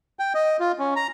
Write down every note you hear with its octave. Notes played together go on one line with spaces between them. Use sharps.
G5
D#5
F4
C#4
A#5